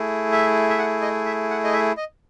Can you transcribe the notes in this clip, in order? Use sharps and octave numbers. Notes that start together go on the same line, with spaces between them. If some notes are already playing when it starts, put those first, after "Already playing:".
Already playing: A3 E4 G#4
E5
E5
F#5
D#5
E5
F#5
D#5
E5
D#5